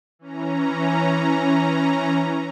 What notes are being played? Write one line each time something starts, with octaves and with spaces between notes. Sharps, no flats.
E3 C#4 A#5